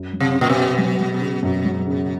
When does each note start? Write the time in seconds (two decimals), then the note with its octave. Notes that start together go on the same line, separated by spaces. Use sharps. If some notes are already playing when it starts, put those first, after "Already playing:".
Already playing: F#2
0.13 F#3
0.20 C3
0.35 C#3
0.41 A#2
0.50 B2
0.57 C#3
0.78 F#3
1.00 F#3
1.21 C#3
1.43 F#2
1.65 F#3
1.87 C#3